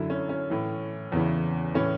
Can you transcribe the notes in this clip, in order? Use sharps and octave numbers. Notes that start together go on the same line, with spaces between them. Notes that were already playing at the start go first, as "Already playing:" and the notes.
Already playing: F#2 D3 E4
C#4
C#4
A2 E3
E2 C#3 E3
A2 E3 C#4